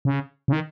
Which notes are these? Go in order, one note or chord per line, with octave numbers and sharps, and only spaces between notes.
C#3
C#3
D#3